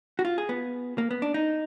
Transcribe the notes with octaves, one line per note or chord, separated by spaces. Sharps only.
F#4
F4
G#4
B3
A#3
B3
D4
D#4